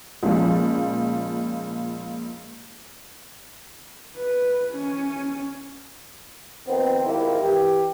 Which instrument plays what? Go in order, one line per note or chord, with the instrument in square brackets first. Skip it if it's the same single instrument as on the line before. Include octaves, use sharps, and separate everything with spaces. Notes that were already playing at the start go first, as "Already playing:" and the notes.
[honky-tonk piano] C#2 A#2 F3
[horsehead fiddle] B4
C#4
[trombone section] D#3 F3 B3 C4
G#2 D#3 E4 F4 G4 A#4
E3 G4